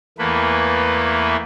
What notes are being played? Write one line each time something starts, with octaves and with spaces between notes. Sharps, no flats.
E2 E3 A3 A#3 B4